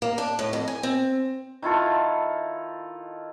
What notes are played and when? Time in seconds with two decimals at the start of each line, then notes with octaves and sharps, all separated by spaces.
0.02 A#3
0.18 D4
0.39 A2
0.53 F2
0.68 G#5
0.83 C4
1.62 D#3 E4 F4 A4